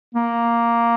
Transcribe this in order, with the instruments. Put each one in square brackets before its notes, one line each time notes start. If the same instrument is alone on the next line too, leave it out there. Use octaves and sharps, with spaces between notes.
[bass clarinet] A#3